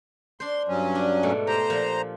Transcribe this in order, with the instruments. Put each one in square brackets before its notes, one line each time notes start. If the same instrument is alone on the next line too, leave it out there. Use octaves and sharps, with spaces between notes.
[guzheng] D4 C5 [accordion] C6
[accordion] G2 F#3 C#4
[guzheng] D4
G#2 B2 A3
[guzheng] G4 [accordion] C5 A#5
[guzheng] A#2 F3